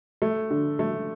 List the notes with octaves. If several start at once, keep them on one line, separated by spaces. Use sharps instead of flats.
A3
D3
A3